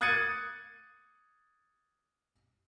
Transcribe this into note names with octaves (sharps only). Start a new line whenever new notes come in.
D#6 F#6 G#6 A6 C#7 D#7